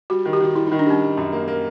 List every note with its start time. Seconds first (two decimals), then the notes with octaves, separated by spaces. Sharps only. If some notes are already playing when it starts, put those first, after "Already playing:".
0.10 G3 F#4
0.25 D#3
0.33 G4
0.41 D#3 F#4
0.55 G3 E4
0.67 D#3 D#4
0.79 D4
0.86 G3 C#4
1.02 G3
1.17 F#2
1.32 A#3
1.48 A#3